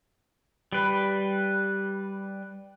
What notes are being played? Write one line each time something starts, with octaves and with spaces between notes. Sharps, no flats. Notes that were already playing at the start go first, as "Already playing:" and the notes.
G3 B4